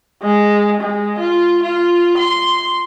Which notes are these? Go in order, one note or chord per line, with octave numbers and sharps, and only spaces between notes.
G#3
G#3
F4
F4
C6